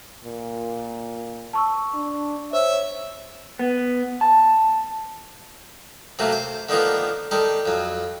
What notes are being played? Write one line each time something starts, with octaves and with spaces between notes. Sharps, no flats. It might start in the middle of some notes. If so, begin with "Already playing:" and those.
A#2
A5 C#6 E6
D4
C5 C#5 E5
B3
A5
C3 F#3 A3 A#3
C5
D3 D#3 F3 A#3 B3
D#3 G3 A4
F2 F#3